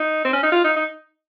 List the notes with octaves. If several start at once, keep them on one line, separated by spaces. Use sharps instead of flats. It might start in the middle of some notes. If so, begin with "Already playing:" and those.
Already playing: D#4
C4
C#4
D#4
F4
D#4
D#4